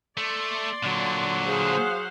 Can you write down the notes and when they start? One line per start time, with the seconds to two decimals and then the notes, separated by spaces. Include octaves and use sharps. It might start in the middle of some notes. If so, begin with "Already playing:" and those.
0.17 A3 D5 C6
0.83 A#2 D3 F#3
1.46 G#4 C5 F5 F#5